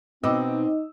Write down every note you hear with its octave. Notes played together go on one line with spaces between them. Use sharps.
B2 C4 D#4 F#4 B4 D#5 D6 E6